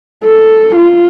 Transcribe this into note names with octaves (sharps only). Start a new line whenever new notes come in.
A4
F4